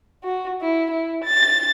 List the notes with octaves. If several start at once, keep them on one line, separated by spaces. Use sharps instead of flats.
F#4
E4
E4
A6